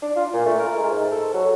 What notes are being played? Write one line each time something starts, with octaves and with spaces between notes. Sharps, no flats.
D4
F4
A#2
A3
A#4
G#3
G#2
A4
F#3